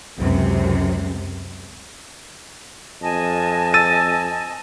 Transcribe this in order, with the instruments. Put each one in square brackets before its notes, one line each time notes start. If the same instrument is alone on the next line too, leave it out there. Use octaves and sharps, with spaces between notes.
[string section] C#2 F#2 C3
[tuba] F2 [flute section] D#5 G#5 A5
[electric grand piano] E6 A6 D#7